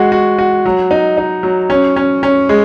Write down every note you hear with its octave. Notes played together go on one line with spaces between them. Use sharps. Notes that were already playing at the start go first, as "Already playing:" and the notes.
Already playing: G#3 F#4
F#4
F#4
F#3
D#4
D#4
F#3
C#4
C#4
C#4
G#3